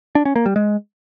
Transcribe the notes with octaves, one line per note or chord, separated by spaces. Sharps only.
D4
C#4
A#3
G3
G#3